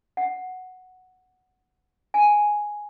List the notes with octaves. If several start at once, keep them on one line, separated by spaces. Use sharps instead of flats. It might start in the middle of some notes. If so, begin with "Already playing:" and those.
F#5
G#5